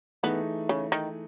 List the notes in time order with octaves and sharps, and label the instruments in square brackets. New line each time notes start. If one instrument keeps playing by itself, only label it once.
[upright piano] E3 A3 D#4 G#4 [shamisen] B3
[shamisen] C#3
D#3